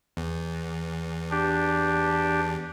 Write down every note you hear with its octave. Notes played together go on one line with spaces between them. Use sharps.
E2
D4 G4